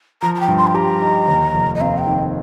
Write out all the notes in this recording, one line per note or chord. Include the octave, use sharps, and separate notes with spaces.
F3 A#5
A#5
G5
G2
C6
G5
G4 A#5
D#4
D#2
F1
D#5
C4 F5
G5
D#3